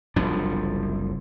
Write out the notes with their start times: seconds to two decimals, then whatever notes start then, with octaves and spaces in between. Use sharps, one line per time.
0.16 F#1 C2 F3 D4